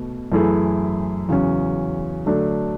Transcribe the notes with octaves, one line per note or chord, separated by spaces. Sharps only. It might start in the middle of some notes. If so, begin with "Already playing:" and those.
Already playing: B2 A3
F#2 E3 A3 E4 G#4
E2 C#3 F#3 C#4
D3 F#3 A3 D4